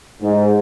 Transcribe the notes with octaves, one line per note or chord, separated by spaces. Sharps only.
G#2